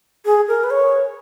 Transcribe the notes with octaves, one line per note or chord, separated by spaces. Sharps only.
G#4
A#4
B4
C#5